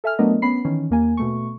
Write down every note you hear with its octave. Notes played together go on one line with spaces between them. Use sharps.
A4 E5 G#5 F6
F#3 A3 B3 D4 A#4 D#5
B3 C#4 B5 C7
D#3 E3 C#4
D#2 A#3 G#5
B2 A3 C#6